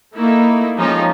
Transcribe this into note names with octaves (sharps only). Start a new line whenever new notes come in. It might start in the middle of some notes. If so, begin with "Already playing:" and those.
A3 A#3 D#4 E4
F3 G#3 C#4 D#4 F4 G4